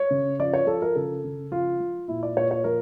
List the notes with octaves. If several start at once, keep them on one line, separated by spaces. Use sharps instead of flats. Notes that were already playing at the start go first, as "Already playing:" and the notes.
Already playing: C#5
C#3
F3 D5
C#5
F3 A4
A#4
C#3 A4
C#3
F3 F4
F3
A#2 E4
D5
A#2 C#5
C#5
F3 A#4